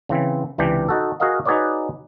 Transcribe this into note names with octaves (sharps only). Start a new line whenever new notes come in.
C#3 E3 C4
C#2 C3 E3 D4 G4 G5
D#4 F#4 A4
F#4 G#4 A#4 D#5 F5
D#4 F#4 G#4 B4 C#5 D5